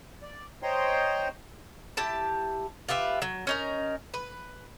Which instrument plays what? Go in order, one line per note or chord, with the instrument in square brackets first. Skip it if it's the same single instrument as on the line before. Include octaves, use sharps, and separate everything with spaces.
[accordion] D5
C5 C#5 D#5 G5 A#5 C6
[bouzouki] E4 G4 A5
F4 G4 B4 E5
F#3
C#4 D#4 A#4
B4